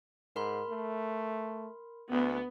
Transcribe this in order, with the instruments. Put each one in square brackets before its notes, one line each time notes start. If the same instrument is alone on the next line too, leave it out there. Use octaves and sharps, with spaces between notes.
[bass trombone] G#2 [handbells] A#4 B5 C6
[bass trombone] A3
[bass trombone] D2 [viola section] B3